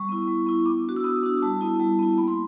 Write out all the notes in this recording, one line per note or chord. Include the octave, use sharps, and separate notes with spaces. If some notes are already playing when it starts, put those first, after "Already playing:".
Already playing: G3 C#6
B3 E4
G3
B3 E4
B3 D6
D4 F#4
E6
B3 D#6
D4 F#4
G3 A5
B3 E4
G3
B3 E4
A#3 B5
C6